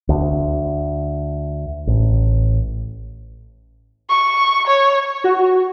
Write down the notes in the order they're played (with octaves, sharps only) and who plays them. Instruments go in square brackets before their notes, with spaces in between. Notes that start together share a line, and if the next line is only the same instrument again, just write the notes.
[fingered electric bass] D2
A1
[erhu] C#6
C#5
[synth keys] F#4